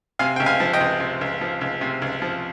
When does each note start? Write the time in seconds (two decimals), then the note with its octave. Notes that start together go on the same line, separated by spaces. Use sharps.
0.19 C3 F5 G#5
0.36 C#2 G5
0.46 F5 G#5
0.60 F3
0.73 D#5 G5
0.80 C#2
1.00 C3
1.21 C#2
1.41 F3
1.61 C#2
1.81 C3
2.02 C#2
2.22 F3